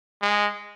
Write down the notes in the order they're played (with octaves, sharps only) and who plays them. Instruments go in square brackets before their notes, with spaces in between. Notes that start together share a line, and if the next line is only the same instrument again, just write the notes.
[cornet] G#3